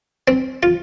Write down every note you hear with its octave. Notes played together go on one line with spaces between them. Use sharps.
C4
F4